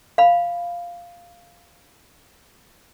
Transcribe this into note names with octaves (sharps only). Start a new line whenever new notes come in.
F5 B5